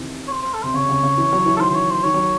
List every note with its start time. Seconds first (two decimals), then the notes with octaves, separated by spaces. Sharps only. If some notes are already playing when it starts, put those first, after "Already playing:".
Already playing: C3 D#3 E3
0.28 C#5
0.32 C5
0.43 C5
0.54 A4
0.63 C3 C5
0.74 C#3 C#5
0.89 C#3
1.03 C#3
1.18 E3
1.33 F#3
1.46 E3
1.57 D#3 A4 C5
1.70 E3 C5 C#5
1.90 C5
2.03 D#3 C#5
2.14 F#3